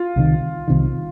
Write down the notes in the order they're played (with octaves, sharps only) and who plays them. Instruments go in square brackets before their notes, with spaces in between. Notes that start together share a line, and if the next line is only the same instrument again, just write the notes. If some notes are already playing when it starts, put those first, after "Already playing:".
Already playing: [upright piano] F4
[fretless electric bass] C2 C3 D#3
C2 C3 D#3